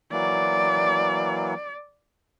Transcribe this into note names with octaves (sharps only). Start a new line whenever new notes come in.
E3 F#3 A#3 D5